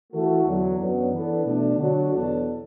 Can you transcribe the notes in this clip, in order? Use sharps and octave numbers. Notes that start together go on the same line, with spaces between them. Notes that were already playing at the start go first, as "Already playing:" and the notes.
E3 A3 F#4 A4
E2 D3 F#3
F#2 F#3 B3 D4
E3 B3 D4 A4
B2 A3 D4
D3 F#3 D4 F#4
E2 B2 F#3 D4 A4